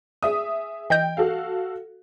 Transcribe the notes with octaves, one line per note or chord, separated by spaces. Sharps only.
G#4 E5 D#6
E3 D#5 G5 G6
F#4 A4 F5